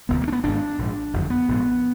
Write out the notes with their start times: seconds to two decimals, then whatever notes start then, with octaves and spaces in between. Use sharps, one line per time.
0.09 F1 D#2 D3 B3
0.21 A#3
0.28 D4
0.32 B3
0.44 G#1 G#2 D4
0.79 A#1 G#2
1.13 F#1 F2 D3
1.30 B3
1.48 A#1 G#2